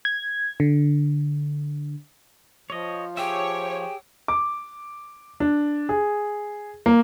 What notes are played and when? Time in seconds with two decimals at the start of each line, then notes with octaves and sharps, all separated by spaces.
0.05 G#6
0.60 D3
2.70 F3 C#5 D#5
3.17 G4 G#4 C#5 E5 G5
4.28 D6
5.40 D4
5.89 G#4
6.86 A#3